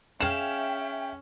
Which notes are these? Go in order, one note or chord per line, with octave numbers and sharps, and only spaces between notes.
C#4 G#4 E5 F5 G5 E7